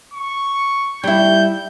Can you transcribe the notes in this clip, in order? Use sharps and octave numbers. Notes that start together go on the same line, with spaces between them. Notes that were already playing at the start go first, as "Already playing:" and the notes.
C#6
G3 E4 G6